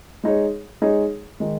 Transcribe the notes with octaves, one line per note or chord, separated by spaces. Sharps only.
G#3 D#4 G#4 C#5
G#3 D#4 G#4 C#5
D#3 G#3